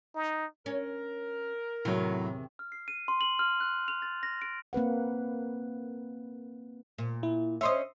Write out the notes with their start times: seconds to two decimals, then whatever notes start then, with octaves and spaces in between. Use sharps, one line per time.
0.15 D#4
0.66 C#4 A#4
1.85 E2 A2 C3 D#3 F#3
2.59 F6
2.72 C7
2.88 D#7
3.08 C6
3.21 F#7
3.39 F6
3.60 F#6
3.88 F7
4.02 A6
4.23 A#6
4.42 D7
4.73 A#3 C4 B4 F#5
6.98 A#2
7.23 E4
7.61 C#4 C5 D#5 E5 C6 D#6